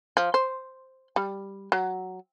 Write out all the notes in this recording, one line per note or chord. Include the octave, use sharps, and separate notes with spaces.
F3
C5
G3
F#3